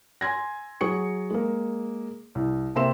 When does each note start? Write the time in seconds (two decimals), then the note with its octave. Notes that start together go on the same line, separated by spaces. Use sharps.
0.21 G#5 C6 G#6 A#6
0.81 F#3 G#4 C#6 C#7
1.31 G#3 A#3
2.35 C2
2.75 C3 A#3 C4 E5 C6 E7